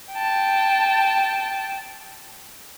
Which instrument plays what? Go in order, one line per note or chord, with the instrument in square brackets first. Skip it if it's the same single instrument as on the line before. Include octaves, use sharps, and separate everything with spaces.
[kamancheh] G5 A5